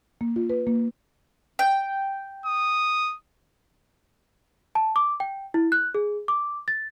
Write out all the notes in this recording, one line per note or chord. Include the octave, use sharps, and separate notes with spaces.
A#3
F4
B4
A#3
G5
D#6
A5
D6
G5
E4
F#6
G#4
D6
A6